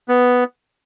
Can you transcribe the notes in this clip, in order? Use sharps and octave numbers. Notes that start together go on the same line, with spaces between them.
B3